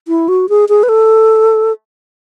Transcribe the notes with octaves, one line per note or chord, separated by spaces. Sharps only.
E4
F#4
G#4
G#4
B4
A4